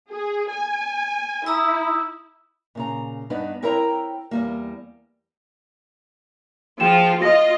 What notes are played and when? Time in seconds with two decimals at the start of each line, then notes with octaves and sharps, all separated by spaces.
0.11 G#4
0.49 G#5
1.46 E4 A#5 D#6 E6
2.75 A#2 C#3 A#5
3.30 G2 B3 D4 D#4
3.62 C4 E4 A#4 C#5 G5 A#5
4.31 E2 G3 A#3
6.80 F3 F4 G#4 G5 E7
7.22 F4 D#5 A#6